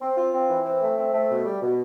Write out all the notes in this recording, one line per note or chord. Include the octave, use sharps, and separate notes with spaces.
C4
F4
C4
E3
C4
A3
C4
A3
B2
G3
B2